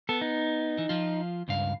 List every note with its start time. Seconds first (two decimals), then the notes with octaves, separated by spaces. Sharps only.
0.09 B3 A4
0.21 D#4
0.78 E3
0.89 F3 F4
1.48 C#2 G2 F5